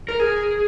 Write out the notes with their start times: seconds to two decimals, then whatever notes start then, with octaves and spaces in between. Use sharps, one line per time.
0.09 A#4
0.20 G#4